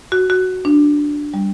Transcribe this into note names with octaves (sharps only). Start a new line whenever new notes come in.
F#4
F#4
D4
G3